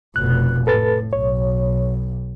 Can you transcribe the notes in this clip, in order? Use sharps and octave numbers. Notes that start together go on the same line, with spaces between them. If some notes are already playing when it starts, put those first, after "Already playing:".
F1 B2 F#6
A2 A4 B4 A6
B1 C#5